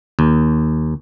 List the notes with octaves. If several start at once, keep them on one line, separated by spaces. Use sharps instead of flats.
D#2